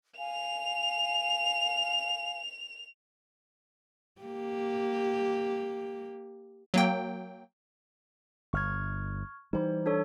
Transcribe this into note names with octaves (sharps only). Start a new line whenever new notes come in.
F5 G#5 F7
A#3 G4
F#3 A#3 G5
G1 C#6 F6 G#6
E3 G3 D#4 C5
D4 A4 C#5